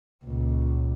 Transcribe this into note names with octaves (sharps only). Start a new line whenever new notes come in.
C#2 A#2